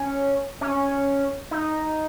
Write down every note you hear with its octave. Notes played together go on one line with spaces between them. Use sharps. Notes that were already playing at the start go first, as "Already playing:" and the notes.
Already playing: C#4
C#4
D#4